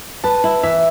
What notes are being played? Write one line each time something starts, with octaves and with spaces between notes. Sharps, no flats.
B4 A5
E4
E3 E5